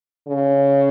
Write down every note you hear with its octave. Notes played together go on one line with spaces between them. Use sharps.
C#3